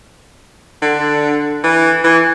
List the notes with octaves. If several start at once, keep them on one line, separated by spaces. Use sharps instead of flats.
D3
E3
E3